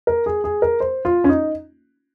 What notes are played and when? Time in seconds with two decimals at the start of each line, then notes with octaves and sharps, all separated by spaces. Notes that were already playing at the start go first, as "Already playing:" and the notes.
0.07 A#4
0.26 G#4
0.44 G#4
0.62 A#4
0.80 C5
1.05 F4
1.24 C#4
1.29 D#4